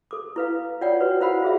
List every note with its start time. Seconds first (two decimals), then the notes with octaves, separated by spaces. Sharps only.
0.11 A4 D6
0.36 E4 B4 F5
0.81 F4 C#5 D5 F#5 G5
1.00 F#4 B4 C#5
1.20 E4 A#4 C5 F5 F#5 B5
1.42 F4 G#4 E5